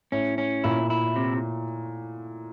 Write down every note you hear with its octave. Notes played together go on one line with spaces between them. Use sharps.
A2 C#4
C#4
A#2 E4
E4
C3